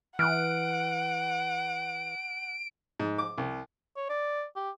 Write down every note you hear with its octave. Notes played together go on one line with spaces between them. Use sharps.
E3 F#5 F6 F#6 D7
G#2
D6
C2
C#5
D5
G4